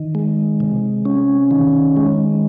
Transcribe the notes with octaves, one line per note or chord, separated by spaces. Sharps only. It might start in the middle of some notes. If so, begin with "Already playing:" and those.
Already playing: D#3
G#3
C3
C#4
D#3
G#3